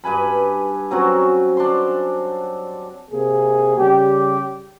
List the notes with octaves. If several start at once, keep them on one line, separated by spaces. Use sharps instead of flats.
G2 B4 G#5 B5
F#3 C4 C#4 F#4
D4 C6
C3 A#3 G#4
C#3 G3 G4